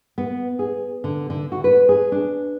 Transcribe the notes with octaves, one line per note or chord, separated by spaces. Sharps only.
B3
G#4
D3
D3
F#4
B4
G#4
D4